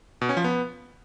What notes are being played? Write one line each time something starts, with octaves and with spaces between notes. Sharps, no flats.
B2
C#4
F3
B3